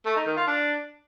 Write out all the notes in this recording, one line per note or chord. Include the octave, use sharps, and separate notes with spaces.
A3
D#4
D#3
F4
D4